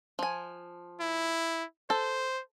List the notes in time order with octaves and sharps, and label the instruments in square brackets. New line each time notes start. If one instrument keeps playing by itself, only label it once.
[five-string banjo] F3 G#5
[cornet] E4
[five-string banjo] A4 [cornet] C5